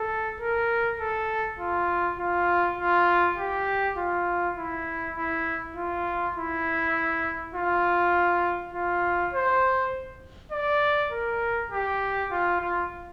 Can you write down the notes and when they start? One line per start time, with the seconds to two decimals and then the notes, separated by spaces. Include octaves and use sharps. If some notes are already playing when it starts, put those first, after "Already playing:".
Already playing: A4
0.40 A#4
1.00 A4
1.59 F4
2.19 F4
2.78 F4
3.38 G4
3.97 F4
4.57 E4
5.16 E4
5.76 F4
6.36 E4
7.54 F4
8.74 F4
9.33 C5
10.52 D5
11.12 A#4
11.71 G4
12.31 F4
12.61 F4